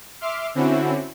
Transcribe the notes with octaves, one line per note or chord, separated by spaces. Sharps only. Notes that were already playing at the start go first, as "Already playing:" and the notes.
E5 C6 D6 F6
D3 C4 C#4 E4 F#4